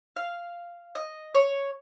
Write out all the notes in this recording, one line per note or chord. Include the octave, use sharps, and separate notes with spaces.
F5
D#5
C#5